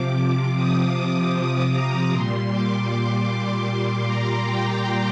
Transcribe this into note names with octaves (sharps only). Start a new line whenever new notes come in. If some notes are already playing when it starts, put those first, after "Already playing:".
Already playing: C3 F3 D6
D#6
D6
A#5
A#2 G3 C6
D6
C6
A#5
G5